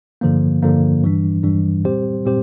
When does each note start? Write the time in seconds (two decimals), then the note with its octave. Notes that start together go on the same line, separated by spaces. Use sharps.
0.21 G2 D3 F3 A#3
0.62 G2 D3 F3 A#3
1.03 G2 E3 G3 D4
1.44 G2 E3 G3 D4
1.84 A#2 G3 C4 G4 C5
2.25 A#2 G3 C4 G4 C5